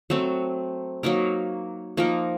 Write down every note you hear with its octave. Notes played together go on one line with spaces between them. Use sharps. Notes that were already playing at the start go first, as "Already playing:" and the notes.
F#3 A3 C4
F#3 A#3 D#4 A#4
F3 A#3 D#4 A#4